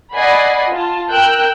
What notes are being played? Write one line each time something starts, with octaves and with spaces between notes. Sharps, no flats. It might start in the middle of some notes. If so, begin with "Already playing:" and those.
D5 D#5 F#5 G#5 B5 C7
F4 A5
A#4 G5 E6 F#6 G6